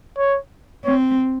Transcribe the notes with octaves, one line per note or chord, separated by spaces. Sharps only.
C#5
C4 C#5